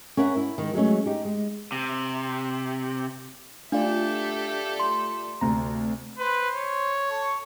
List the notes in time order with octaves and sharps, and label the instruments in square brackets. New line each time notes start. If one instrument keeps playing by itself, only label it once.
[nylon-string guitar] C#4 A#4 E5 F#5
E4
D#3 G#3
F#3 G#3 A3 C#4
D#4 G4
G#3
[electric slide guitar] C3
[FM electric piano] A3 F4 D5 [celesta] D4 [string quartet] G4 A4 E5
[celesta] C6
[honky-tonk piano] D2 C3 [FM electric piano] A#5
[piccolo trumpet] B4 [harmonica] C5
[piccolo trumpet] C#5
[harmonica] A4 C#6